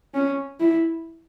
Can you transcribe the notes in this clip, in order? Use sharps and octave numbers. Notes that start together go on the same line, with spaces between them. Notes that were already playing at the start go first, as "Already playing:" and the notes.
C#4
E4